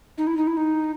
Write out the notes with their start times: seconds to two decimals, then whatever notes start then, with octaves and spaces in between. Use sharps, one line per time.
0.18 D#4
0.27 E4
0.37 D#4
0.47 E4
0.57 D#4